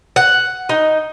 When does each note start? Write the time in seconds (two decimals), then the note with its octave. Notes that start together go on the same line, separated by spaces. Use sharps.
0.16 F#5
0.69 D#4